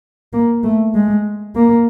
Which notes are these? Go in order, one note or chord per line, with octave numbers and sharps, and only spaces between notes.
A#3
A3
G#3
A#3